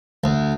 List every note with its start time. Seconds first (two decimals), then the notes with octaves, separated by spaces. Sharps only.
0.24 D2